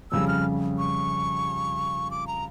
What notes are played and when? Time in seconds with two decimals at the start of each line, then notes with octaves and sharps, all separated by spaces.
0.11 F2 C#3 G3 E6
0.28 F6
0.78 C#6
2.11 D6
2.27 A#5